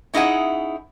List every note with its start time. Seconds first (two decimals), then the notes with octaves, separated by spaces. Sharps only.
0.14 C#4 D#4 E4 G#4 F#5